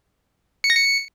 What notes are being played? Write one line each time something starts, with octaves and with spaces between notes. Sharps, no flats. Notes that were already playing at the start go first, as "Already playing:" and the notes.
C#7
A#6
C#7